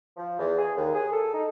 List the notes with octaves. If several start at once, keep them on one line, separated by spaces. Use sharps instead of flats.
F3
E2
G#4
D#2
G#4
A4
D#4